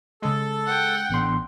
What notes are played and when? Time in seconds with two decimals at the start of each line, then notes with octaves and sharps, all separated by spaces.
0.22 C#3 G#3 A4
0.66 F#5 G5
1.10 A1 D3 B3 C6